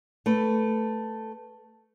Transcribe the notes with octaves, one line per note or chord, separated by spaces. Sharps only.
A3 A4 B4